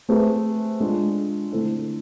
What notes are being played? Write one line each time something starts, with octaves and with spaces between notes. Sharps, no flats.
A3 C4 G#4 B4
G#3 D4 F4
D3 A3 C4 E4 A4